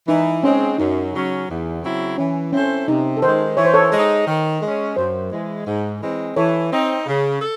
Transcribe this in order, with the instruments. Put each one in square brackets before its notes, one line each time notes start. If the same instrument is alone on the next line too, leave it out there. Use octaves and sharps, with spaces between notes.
[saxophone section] E3 [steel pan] D#4
[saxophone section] G#3 C4 [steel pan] C#4
[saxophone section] F#2 [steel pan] D#4
[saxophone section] C#3 F#3 C#4
E2
C#3 F#3 C4 E4
[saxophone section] E3 [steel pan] C#4
[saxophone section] C4 E4 A4 C5 [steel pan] C#4
[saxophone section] C3 [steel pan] D#4
[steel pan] A4
[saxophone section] D#3 G#3 [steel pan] C5
[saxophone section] E3 [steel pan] C#5
[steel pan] C5
A4 C#5
[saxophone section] G#3 D#4
D#3
G#3
C#4
[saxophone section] F#2 [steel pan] C5
[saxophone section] E3 G#3
G#2
E3 G#3 C4
[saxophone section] E3 [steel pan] A4 C#5
[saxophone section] C4 D#4
C#3
A4